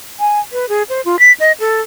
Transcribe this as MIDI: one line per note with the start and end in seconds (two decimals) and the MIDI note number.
0.20 0.40 80
0.52 0.68 71
0.69 0.83 68
0.89 1.01 72
1.05 1.19 65
1.19 1.32 95
1.40 1.52 75
1.60 1.81 69